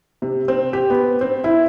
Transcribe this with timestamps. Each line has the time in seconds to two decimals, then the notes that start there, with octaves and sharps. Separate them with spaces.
0.22 C3
0.48 C4
0.73 G4
0.90 B3
1.21 C4
1.44 E4